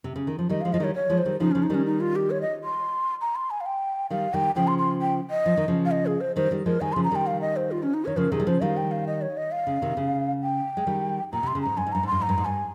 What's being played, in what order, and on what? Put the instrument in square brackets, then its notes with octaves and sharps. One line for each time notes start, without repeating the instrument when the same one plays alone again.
[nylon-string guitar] C3
C#3
D#3
F3
[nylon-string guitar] D#3 G3 [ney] D#5
[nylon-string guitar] F3 G#3 [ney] F5
[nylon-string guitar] F3 [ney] D#5
[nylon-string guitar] D#3 G3 [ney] C#5
[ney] C#5
[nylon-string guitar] F3 G#3
[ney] C5
[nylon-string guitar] D#3 G3
[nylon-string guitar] C#3 F3 [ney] D#4
[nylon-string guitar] C#3 F3 [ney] C#4
[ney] D#4
[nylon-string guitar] D#3 G3 [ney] C#4
[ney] D#4
F4
G4
C#5
D#5
C6
A#5
C6
G#5
F5
G5
[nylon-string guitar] D#3 G3 [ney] F5
[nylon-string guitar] D#3 G3 [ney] G5
[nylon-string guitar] C#3 F3 [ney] G5
[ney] C6
C6
G5
D#5
[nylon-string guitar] F3
D#3
C#3 F3
[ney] F5
D#5
G#4
C5
[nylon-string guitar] D#3 G3 [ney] C5
[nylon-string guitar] D#3 G3
[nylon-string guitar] F3 G#3 [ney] A#4
[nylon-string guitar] D#3 G3 [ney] G#5
[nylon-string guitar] C#3 F3 [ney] C6
[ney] A#5
[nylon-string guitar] D#3 G3 [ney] G5
[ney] F5
D#5
C5
F4
C#4
D#4
[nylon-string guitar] D#3 [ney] C#5
[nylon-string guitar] C#3 F3 [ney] A#4
[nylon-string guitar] C3 D#3 [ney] G#4
[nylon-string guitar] G3
[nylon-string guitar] C#3 F3 [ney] C5
[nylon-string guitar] D#3 G3 [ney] F5
[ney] G5
F5
D#5
C#5
D#5
F5
[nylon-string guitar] C#3
C3 D#3
C#3
[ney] G5
[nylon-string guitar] G#3
D#3 G3
[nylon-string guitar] A#2 [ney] A#5
[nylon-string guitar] C3
[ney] C6
[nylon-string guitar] C#3
[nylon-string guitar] G#2 [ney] A#5
[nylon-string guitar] G2 [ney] G#5
[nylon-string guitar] G#2
[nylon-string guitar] G2 [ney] A#5
[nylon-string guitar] G#2
[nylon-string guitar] G2 [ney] C6
[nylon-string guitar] G#2 [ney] A#5
[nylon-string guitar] G2
G#2
[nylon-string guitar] G2 [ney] G#5